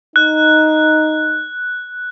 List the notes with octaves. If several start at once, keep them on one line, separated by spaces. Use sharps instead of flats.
D#4 F#6